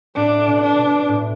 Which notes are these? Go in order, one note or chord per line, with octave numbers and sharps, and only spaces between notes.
A2 D4
B2
D4
B2
A2